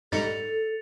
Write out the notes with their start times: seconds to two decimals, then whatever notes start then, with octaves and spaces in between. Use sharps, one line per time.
0.12 G#2 G3 D#4 A4 A6 C#7 F7